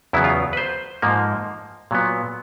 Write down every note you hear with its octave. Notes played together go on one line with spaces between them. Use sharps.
E2 C#3 F#3 B3 E4
F4
B4
C5
G#2 F3 A#3
A#2 F#3 B3